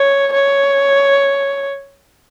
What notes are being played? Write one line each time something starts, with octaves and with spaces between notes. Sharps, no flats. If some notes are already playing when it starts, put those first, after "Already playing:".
Already playing: C#5
C#5